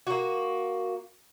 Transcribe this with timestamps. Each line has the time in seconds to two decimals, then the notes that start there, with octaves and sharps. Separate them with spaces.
0.07 A#3 F#4